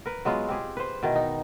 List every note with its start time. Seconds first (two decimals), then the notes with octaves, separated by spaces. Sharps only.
0.06 A#4 B4
0.25 F#3 G#3 B3 F4
0.48 C4 G4 G#4
0.77 B4 C5
1.03 B2 D#3 E3
1.16 D#4